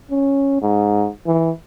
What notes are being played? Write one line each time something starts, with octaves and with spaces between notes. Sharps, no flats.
C#4
G#2
E3